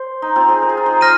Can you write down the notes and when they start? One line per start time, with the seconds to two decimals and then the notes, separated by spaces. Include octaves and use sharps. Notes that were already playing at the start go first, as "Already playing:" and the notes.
Already playing: C5
0.22 D#4
0.36 C4 F4
0.48 D#4 G#4
0.62 A#4
0.69 G#4
0.77 F4
0.86 D#4 G#4
1.01 G#4 C5 F6 A#6 D#7